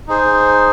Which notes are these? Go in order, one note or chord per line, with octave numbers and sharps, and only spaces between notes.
D#4 G#4 C5